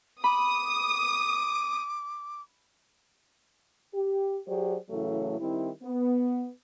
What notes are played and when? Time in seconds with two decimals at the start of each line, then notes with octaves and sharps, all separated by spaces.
0.24 B5 D6 D#6
3.94 G4
4.46 F#3 G4 G#4 C5 D5
4.89 A2 C#3 E3 F#3 A3
5.40 D#3 G3 C4 E4
5.82 B3